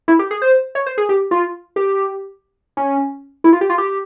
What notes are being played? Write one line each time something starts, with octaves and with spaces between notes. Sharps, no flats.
E4
G4
G#4
C5
C#5
C5
G#4
G4
F4
G4
C#4
E4
F4
G4
F4
G4